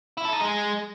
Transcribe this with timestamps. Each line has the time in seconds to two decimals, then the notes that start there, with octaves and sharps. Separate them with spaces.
0.17 E4
0.25 A4
0.33 D#4
0.40 G#3